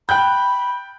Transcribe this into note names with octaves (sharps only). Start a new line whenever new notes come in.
G5 B5 F#6 G6